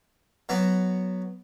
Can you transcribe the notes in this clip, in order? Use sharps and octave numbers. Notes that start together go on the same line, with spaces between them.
F#3 B3 F#4